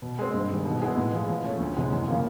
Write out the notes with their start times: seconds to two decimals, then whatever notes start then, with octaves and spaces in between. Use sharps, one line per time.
0.02 B2
0.19 G#3 C4
0.34 G2
0.50 D#3 G3
0.65 B2
0.82 G#3 B3 E4 G#4
0.97 A2
1.13 F3 G#3
1.29 F3
1.45 A3 C#4
1.60 D2
1.76 C3 E3 G#3 B3
1.92 F#2
2.08 C#3 F3 A#3